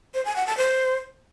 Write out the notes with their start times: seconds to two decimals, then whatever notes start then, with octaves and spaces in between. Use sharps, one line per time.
0.14 C5
0.25 G#5
0.36 F#5
0.47 A5
0.58 C5